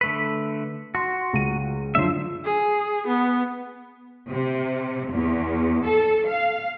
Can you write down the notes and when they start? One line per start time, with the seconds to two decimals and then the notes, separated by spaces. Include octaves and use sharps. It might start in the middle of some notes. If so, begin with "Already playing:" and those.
0.01 D3 A3 B4
0.95 F#4 C6
1.33 C#2 D#7
1.95 F#2 D3 F3 C5 E5
2.45 G#4
3.07 B3
4.29 C3
5.10 E2
5.86 A4
6.28 F5